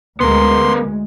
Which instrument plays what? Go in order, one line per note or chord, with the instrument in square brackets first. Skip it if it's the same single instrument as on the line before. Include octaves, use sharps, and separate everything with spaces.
[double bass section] D2 G#3 [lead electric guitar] B3 A#4 [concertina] C6